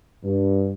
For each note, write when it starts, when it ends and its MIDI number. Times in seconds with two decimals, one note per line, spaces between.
0.24 0.72 43